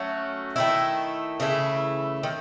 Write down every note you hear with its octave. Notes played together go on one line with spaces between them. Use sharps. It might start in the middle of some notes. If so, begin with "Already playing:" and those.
Already playing: F#3 A3 C#4 F#4
D#3 A3 E4
C#3 E3 A3 E4
D#3